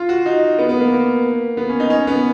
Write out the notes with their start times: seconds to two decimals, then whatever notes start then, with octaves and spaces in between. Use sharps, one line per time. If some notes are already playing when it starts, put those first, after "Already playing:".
Already playing: F4
0.09 F#4
0.26 D#4
0.58 B3
0.69 B3
0.80 A#3
0.92 A#3
1.57 B3
1.69 C#4
1.80 D#4
1.90 C#4
2.07 B3